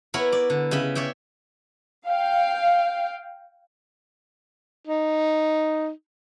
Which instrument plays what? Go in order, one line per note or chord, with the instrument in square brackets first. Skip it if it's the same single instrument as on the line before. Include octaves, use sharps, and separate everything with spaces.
[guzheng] B3 E4 A#4 C#5
D5
D3
C#3 D#5 E5 B5
C#5 D5 E5 G5
[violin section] F5 G5
[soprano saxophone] D#4